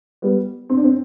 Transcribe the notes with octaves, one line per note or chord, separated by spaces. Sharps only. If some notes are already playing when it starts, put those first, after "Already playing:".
G3 B3
C4
D4
C4